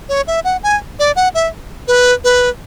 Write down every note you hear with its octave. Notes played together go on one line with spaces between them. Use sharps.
C#5
E5
F#5
G#5
D5
F#5
E5
B4
B4